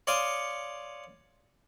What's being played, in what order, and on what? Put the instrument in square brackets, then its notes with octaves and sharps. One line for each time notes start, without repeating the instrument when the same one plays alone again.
[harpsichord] C#5 D5 F5 C6 C#6 D#6